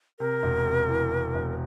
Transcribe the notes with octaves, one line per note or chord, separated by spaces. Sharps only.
C3 A#4
E1
C3
E3
E3
E1